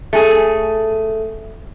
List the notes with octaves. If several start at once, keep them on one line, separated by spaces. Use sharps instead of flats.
A3 G#4